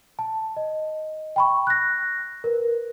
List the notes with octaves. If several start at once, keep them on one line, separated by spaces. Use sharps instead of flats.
A5
D#5
G5 B5 C#6
F#6 A#6
A#4 B4